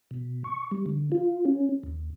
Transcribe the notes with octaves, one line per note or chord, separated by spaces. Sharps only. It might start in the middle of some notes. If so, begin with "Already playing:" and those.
B2
C#6
G3
D3
F4
C#4
D#2